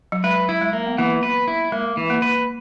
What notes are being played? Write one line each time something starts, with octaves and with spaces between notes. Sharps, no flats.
F#3
G#3 B4
E4
G#3
A#3
B3
E3 A#3
B4
E4
G#3 A#3
E3
A#3
B4